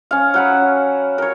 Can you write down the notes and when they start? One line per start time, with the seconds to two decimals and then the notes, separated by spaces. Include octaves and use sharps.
0.11 C#4 F5
0.34 F#3 F#5 B5
1.18 A#4 C#5